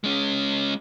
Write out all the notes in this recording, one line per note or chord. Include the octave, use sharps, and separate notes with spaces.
G#3 C#4